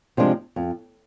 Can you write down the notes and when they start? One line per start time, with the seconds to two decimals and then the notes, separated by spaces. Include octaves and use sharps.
0.17 C3 F3 G#3 D4
0.56 F2